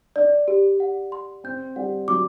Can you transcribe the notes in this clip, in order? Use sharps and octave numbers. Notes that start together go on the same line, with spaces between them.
D4 D5
G4
F#5
C6
C4 G6
G3 F#5
F#3 D6